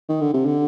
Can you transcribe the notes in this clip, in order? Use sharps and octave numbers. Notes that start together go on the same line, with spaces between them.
D#3
D3
C3
D3